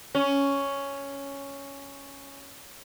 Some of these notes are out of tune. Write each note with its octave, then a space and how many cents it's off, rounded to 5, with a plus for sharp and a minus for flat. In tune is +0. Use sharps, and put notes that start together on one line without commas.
C#4 +5